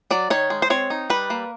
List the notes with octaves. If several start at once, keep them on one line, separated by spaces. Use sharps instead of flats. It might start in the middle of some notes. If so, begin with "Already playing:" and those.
F#3 D5
D#3 C#5
G#3
C5
C4 C#5
D#4
G3 B4
A#3